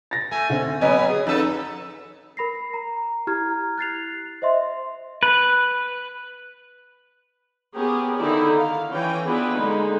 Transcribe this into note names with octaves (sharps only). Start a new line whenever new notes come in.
A6 A#6
A3 G#5
D3 C4 C#4
C3 F#3 B3 D#5 G#5
G#4
F2 D#4 A4 B4
A#4 B5 A#6 C7
A#5
E4 G4 A#5 F6 G#6
F#6 A6 C7 F7
C5 D#5 E5 C6
B4
B3 C#4 G4 G#4 A#4
D3 D#3 D#4 E4 D5
F5
E3 C#4 G5 G#5
B3 D4 E4 F4 G#4 B4
D3 G#3 D#4